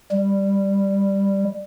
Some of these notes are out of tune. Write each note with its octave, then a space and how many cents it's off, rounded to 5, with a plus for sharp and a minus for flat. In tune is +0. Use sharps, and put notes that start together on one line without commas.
G3 +10